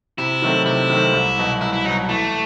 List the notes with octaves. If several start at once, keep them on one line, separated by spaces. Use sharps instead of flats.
C3 E4
D#3 F#3 A3 C4
C3 E4
D#3 F#3 A3 C4
C2
B2 F#3
C2 E4
E4
B2 F#3 D#4
E3 A3